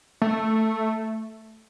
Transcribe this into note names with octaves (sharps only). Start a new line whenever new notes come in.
A3